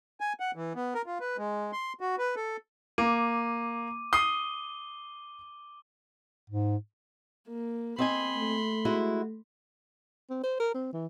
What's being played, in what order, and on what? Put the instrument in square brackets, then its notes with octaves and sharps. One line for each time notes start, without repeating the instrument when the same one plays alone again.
[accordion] G#5
F#5
E3
B3
A#4
F4
B4
G#3
C6
F#4
B4
A4
[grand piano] A#3 [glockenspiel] D6 D#7
[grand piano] D#6 C7 [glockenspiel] G7
[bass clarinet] G#2
[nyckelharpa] A#3
[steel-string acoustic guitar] C4 D#5 G#5 [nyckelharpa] B5 C6
[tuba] A3
[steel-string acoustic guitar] G#3 E4 F#4
[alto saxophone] C4
C5
A#4
C4
E3